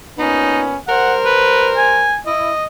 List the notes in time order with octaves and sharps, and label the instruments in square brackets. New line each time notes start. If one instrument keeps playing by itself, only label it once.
[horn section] A#2 B3 C#4 [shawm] D#4
[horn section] G3 A#4 C5 [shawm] F#5
[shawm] B4
G#5
[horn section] E4 [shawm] D#5